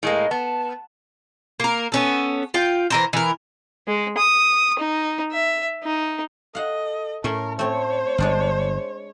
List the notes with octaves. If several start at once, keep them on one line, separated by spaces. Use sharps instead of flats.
A2 G#3 A#3 D#5
B3 A5
A#3 A#4
B3 C#4 A4
F4 G5
E3 A#4 C5
E3 A#4
G#3
D#6
D#4
E5
D#4
A4 D#5 F5 F#5
A2 A3 C#4 A#4
A3 C4 C5 C#5
G1 G#3 D4 F#5